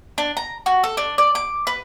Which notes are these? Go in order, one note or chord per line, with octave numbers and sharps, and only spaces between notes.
D4
A#5
F#4
A4
D4
D5
D6
B4